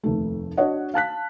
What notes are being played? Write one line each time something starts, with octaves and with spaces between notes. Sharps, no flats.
F1 D#2 A3
D4 F#4 C#5 D#5 F#5
F5 A5 F#6 B6